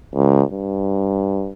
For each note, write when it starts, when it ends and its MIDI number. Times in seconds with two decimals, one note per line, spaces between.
0.14 0.42 37
0.52 1.53 43